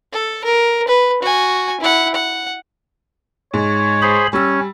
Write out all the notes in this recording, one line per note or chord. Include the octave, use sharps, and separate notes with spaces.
A4
A#4
B4
F#4 G#5
E4 F#5
F#5
G#2 C#5
G#4 C5 B5
G3 C#4 E6